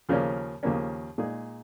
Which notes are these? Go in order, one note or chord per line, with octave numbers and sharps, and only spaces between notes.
D#2 C#3 F3 A#3 C#4
D#2 C#3 F3 A#3 C#4
A#2 G#3 D#4 G#4